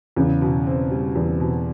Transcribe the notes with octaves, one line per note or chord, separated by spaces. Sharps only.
E2 C#3
B2
C4
G3
E2
B2